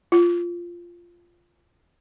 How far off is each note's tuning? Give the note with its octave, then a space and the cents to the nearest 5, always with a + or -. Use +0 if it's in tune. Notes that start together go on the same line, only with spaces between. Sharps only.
F4 -10